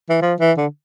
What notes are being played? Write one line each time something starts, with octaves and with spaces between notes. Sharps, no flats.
E3
F3
E3
D3